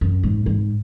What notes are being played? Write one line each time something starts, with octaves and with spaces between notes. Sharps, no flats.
F#2
G#2
G#2